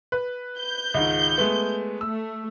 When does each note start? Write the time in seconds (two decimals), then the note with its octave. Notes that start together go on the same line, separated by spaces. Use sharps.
0.12 B4
0.58 G6
0.94 C#2 G#2 D#3
1.38 G#3 A3 B3
2.01 A3 E6